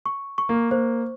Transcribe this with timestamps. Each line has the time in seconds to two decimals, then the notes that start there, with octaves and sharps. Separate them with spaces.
0.06 C#6
0.38 C#6
0.49 A#3
0.71 A#3 C5